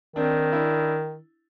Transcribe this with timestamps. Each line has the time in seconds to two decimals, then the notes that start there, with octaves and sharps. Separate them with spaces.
0.16 D#3 C4 D4
0.52 D4 E4